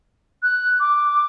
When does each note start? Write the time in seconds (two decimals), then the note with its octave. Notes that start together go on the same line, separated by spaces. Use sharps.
0.42 F#6
0.80 D6